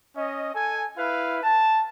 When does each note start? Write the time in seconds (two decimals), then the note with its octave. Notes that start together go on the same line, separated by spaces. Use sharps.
0.17 C#4 D#5
0.55 A4 G#5
0.98 E4 B4 F5
1.44 A5